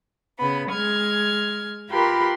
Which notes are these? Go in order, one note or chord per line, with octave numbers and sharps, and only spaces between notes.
C#3 B3 B5
G#3 F6 G#6
F4 G4 A#4 B4 B5 C6